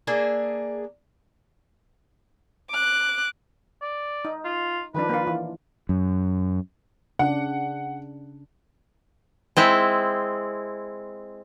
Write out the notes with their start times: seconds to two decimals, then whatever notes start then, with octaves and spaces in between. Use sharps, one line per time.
0.07 A#3 D4 G#4 E5
2.70 D6 F#6
3.82 D5
4.25 D#4
4.45 F4
4.94 D#3 F3 D4 B4
5.09 A#3 F4
5.27 E3
5.89 F#2
7.19 C#3 D4 F#5
9.57 G#3 C4 E4